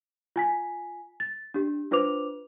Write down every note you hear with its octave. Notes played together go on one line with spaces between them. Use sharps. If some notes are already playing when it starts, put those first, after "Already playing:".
F4 G#5 B6
A6
D4 G4
D4 F4 B4 C5 D6 F7